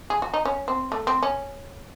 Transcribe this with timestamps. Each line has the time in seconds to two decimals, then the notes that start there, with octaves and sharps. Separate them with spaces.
0.10 G#4
0.22 F#4
0.33 D#4
0.45 C#4
0.68 C4
0.92 A3
1.07 C4
1.22 C#4